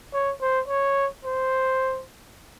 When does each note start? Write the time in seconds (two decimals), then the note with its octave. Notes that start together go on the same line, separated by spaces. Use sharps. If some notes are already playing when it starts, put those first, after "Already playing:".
0.13 C#5
0.41 C5
0.68 C#5
1.25 C5